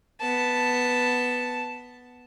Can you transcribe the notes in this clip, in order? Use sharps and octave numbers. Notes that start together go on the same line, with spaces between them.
B3 A5